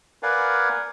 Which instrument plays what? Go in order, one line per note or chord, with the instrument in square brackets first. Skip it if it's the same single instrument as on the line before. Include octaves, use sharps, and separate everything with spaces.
[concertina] A#4 B4 D5 F5 F#5 G#5